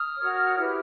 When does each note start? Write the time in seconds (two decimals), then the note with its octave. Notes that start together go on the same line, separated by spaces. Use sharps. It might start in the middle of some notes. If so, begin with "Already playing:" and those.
Already playing: D#6 F6
0.16 F#4 A#4 C#5
0.56 E4 G4 B4